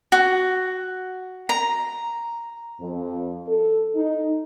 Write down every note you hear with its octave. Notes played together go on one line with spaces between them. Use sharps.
F#4
A#5
F2
A4
D#4